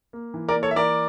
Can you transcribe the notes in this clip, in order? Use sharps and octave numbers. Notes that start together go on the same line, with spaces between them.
A#3
E3
A#4 D5
A#3
A4 C#5
E5
E3 A#4 D5